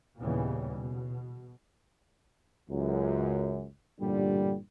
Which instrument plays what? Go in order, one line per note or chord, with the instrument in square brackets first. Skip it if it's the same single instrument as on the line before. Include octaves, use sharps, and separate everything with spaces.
[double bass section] D#2 A#2 C#3 E3 G3 B3
B2
[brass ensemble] C#2 F#2
A1 G2 A#2 D3 G3